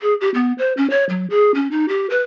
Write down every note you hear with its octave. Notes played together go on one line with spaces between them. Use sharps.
G#4
G4
B3
C5
C#4
C#5
F#3
G#4
C#4
D#4
G4
B4